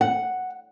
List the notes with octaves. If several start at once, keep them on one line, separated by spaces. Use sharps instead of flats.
F#5